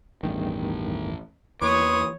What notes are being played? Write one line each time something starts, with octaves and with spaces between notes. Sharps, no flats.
A1 E2 G2 D#3
E2 E3 A#3 B4 C#5 C6 C#6 D#6